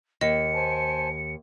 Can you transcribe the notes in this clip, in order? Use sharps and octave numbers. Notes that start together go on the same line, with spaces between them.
D#2 D#5 C#7
C5 G#5 A5